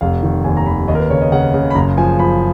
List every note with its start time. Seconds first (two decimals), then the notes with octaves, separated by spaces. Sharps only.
0.01 F1 F5
0.23 D#3
0.44 D#2 G#5
0.57 A#5
0.66 D#2 B5
0.88 D#2 D#5
0.95 A#4
0.99 B4
1.10 C#3 C#5
1.21 D#5
1.32 C#3 F#5
1.54 C#3
1.70 B5
1.75 F#1 A#5
1.97 F3 G#5
2.19 F3 B5